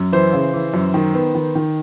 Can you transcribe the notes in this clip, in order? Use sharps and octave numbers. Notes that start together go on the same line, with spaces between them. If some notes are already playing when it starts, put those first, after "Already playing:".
Already playing: F#2
E3 C5
C#3
E3
F#2
D#3
B3
D#3
D#3